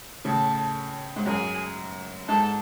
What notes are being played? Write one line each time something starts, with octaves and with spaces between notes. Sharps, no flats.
A2 C#3 A4
G#2
F#2 G#4
G#2 A4